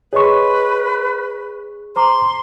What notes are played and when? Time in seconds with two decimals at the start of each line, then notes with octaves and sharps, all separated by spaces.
0.13 G#4 B4 C#5 D#5 C6 C#6
1.96 C5 A#5 C6 D6